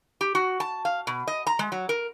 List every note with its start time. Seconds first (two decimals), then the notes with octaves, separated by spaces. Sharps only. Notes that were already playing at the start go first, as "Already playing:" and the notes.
0.21 G4
0.35 F#4
0.60 A5
0.85 F5
1.07 B2
1.27 D#5
1.47 A#5
1.59 G#3
1.72 F#3
1.89 A#4